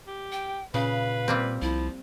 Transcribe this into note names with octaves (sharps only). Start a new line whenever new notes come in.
G4
G5
A#2 C#3 B4 F5
G3 A#3 C4
C2 F3 E4